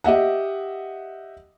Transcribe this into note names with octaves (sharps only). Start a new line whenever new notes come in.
G4 D#5 E5 F#5